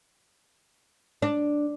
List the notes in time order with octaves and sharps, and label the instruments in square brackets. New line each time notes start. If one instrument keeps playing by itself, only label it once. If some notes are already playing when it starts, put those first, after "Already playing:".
[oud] D4